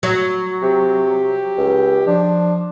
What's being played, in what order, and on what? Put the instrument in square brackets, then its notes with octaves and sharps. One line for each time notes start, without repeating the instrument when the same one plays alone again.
[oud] F#3
[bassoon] C3 [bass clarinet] G4
[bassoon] C#2
[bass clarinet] F3 [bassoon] D4